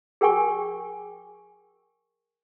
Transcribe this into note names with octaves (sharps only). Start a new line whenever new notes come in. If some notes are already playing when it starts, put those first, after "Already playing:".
G#4 A#4 G5 G#5 C#6